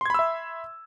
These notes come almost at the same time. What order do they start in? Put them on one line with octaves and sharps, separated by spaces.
C6 G#6 B5 E6 E5